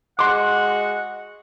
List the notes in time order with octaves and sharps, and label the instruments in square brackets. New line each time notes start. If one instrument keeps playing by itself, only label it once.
[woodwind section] G#3 F#4 F#5 [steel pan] C6 D6